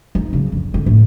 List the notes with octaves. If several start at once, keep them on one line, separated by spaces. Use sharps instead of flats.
D#4
C#3 F#3
F2
D3
A2